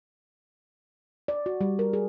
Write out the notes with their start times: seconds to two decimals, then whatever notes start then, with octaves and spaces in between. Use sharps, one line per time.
1.28 D5
1.46 F#4
1.61 G3
1.79 A#4
1.93 G#4